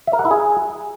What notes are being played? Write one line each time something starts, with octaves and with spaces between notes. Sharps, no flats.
E5
A#4
F#5
E4
G#4